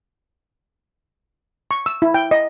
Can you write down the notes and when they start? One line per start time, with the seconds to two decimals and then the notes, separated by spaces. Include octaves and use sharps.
1.71 C#6
1.86 E6
2.02 E4
2.14 G5
2.31 D#5